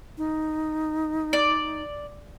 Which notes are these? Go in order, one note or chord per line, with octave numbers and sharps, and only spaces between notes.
D#4
D5